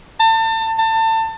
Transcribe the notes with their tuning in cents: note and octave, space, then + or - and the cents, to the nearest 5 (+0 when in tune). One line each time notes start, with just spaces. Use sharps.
A5 +30
A5 +30